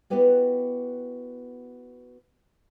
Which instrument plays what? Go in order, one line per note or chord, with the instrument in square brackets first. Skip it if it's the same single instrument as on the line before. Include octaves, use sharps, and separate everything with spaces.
[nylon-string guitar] B3 E4 F#4 G4 B4 D5